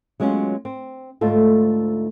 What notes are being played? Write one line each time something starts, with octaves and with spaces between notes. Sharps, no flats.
F#3 G#3 B3 C#4 F4
C4
D2 G#2 A3 F4 A4